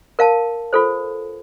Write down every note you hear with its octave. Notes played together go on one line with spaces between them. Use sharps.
A#4 F5 A5
F4 A4 C5